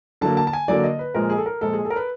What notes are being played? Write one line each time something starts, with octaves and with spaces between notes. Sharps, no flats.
D3 F#3 A#3 A5
A5
A5
G#5
D3 F#3 A#3 D5
D#5
B4
A#2 F3 G#3 A#4
G#4
A4
A#4
A#2 F3 G#3 A4
G#4
A4
A#4
B4